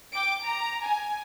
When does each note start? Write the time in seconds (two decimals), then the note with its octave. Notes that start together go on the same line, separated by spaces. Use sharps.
0.12 G5 D6 D7
0.44 A#5
0.86 G#5